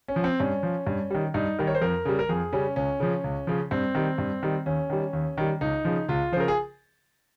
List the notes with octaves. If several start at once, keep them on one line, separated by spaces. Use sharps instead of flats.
C#4
F3
C4
G2 C#4
F3
G2
D#3 G3
G2 D#4
D#3 G3 A#4
C#5
C5
F2 A#4
C#3 G3
A#4
F2 G#4
C#3 G3 C#4
C#2 C#4
C#3 F3
C#2
C#3 F3
G2 C4
D#3 G3
G2
D#3 G3
D#2 C#4
D#3 G3
D#2
D#3 G3
C#2 D#4
C#3 F3
C#2 F4
C#3 F3 A#4 C5
G#4